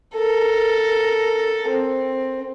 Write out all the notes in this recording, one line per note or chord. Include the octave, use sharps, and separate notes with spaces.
A4 A#4
C4